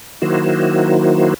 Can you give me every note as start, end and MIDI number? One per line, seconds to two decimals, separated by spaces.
0.22 1.34 51
0.22 1.34 54
0.22 1.34 58
0.22 1.34 64
0.22 1.34 66
0.22 1.34 72